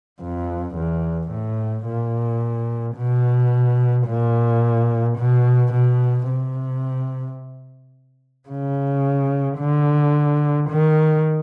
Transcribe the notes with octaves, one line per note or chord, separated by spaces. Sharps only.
F2
E2
A2
A#2
B2
A#2
B2
B2
C3
C#3
D3
D#3